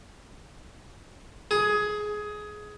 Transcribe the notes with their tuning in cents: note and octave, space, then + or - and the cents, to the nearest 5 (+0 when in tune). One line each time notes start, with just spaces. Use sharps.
G#4 +15